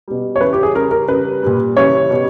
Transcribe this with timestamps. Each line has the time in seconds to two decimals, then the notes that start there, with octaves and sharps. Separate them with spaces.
0.08 B2 G3
0.36 C#5
0.41 C#3 E3 G3 B4
0.53 G4
0.63 G#4
0.75 C#3 G3 A#4
0.91 A#4
1.08 C#3 G3 B4
1.43 A#2 G3
1.77 C#3 E3 G3 C#5
2.10 B2 G3